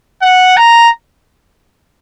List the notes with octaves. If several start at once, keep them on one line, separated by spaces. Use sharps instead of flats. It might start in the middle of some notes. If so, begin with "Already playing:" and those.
F#5
A#5